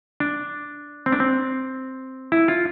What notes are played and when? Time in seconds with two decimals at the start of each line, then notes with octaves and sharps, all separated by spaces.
0.20 D4
1.06 C4
1.12 D4
1.20 C4
2.32 E4
2.48 F4